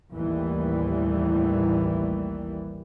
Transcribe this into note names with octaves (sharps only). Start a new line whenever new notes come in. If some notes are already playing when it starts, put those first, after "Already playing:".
A1 D#2 E3 G3